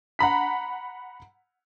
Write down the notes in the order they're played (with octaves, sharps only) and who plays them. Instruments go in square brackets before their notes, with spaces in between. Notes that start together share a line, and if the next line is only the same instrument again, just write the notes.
[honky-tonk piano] F#5 A#5 B5 B6